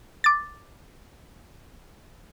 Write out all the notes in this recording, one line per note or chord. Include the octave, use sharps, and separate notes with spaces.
D6 A6